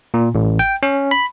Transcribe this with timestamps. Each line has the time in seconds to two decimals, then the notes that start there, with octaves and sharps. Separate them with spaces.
0.14 A#2
0.35 A1
0.59 G5
0.83 C#4
1.11 B5